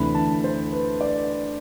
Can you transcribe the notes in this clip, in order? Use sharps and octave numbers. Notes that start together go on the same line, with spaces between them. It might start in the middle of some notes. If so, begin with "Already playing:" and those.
Already playing: D2 C3 E3 A3 D4 B5
A5
C5
B4
D5